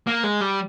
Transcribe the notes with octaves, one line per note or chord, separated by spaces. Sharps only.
A#3
G#3
G3